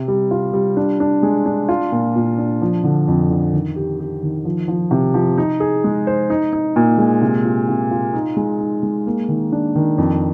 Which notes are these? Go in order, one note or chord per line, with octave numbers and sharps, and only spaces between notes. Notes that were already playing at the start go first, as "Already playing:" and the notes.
Already playing: C3 C4
G3
F4
G3
D4
D4
G#3
D4
F4
A#2
A#2
D4
F3
D3
F2
D3
D#3
G4
G4
D#3
F3
F3
C3
F3
D#4
G#4
G#3
C5
D#4
D#4
A#2
G#3
C3
F4
C3
F4
D#4
G#3
D#4
G#3
A#3
D#3
D4
D#3
F2